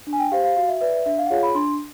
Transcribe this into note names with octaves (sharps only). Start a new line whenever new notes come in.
D4
G#5
G5
G4 C5 F5
F5
F#4 F5
E5
B4 D5 E5
E5
D4 E5
F5
F#5
F4 G#4 C#5 F5
B5
D4 C6